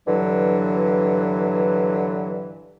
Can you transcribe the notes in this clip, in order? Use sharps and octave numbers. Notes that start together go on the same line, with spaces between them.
G2 D3 E3 F#3